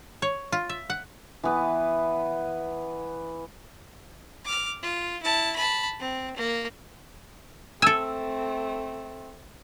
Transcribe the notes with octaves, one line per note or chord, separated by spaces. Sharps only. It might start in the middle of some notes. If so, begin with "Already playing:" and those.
C#5
F4
E5
F#5
E3 B3
D6 F6
F4
E4 A5
A5 B5
C4
A#3
A3 C4 A4 G#5 E6